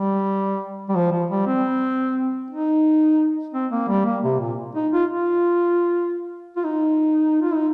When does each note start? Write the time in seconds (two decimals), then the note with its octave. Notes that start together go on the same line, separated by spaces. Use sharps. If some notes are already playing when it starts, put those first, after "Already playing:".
Already playing: G3
0.89 G3
0.96 F3
1.12 F3
1.30 G3
1.47 C4
2.51 D#4
3.54 C4
3.71 A#3
3.88 G3
4.05 A#3
4.23 C3
4.40 A#2
4.75 D#4
4.92 F4
5.10 F4
6.56 F4
6.65 D#4
7.42 F4
7.55 D#4